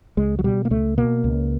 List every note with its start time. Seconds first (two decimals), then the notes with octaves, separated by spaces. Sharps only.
0.17 C#2 G#3
0.39 F#3
0.44 B2 G3
0.65 A#3
0.70 C#2 A3
0.98 B2 A#3
1.24 C#2